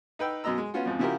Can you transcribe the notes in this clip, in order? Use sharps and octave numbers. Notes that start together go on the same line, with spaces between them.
D#4 B4 G5 E6
F#2 B2 D#5 A#5 E6
G#3
B3 C#4 F4 F#4
F2 G#2 F3
C#3 F3 E4 F#4 G4 A#4